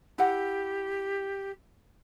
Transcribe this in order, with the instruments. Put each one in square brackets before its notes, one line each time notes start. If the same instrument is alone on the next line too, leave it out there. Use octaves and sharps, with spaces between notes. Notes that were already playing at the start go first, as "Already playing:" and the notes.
[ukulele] E4 F#5 [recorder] G4